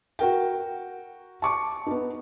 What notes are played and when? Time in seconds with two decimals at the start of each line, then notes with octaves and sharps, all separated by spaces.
0.19 F#4 A#4 G5
1.42 A5 C#6 D6
1.87 B3 D#4